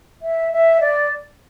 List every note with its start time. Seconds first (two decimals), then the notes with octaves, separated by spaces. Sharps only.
0.22 E5
0.52 E5
0.80 D5